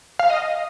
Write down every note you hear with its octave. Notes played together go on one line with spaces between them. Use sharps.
F5
D#5